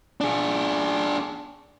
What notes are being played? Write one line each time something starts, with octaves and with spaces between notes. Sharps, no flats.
D4 G#4